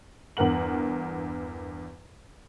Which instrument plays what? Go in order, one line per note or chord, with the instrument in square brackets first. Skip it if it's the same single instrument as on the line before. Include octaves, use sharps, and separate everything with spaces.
[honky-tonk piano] E2 G2 A#4 F#5 F#7